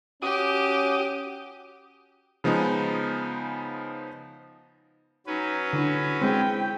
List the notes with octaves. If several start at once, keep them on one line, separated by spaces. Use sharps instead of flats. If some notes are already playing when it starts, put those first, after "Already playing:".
C#4 F#4 G4 D6 D#6
C#3 F3 G#3 B3 D#4
F#3 C#4 D#4 B4
D3 E4
G#3 C4 G5